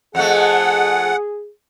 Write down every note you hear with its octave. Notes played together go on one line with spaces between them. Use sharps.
F2 A3 G#4 F#5